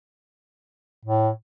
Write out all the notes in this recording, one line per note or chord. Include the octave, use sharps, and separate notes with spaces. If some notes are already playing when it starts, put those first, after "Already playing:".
A2